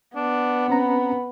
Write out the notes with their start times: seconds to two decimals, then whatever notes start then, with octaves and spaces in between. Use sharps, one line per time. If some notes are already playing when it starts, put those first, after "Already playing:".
0.15 B3 D4
0.68 C4 C#4 B4 A#5